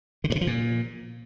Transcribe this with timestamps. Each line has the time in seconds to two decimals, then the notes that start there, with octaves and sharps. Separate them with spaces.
0.24 D3
0.30 G2
0.36 C3
0.41 F3
0.47 A#2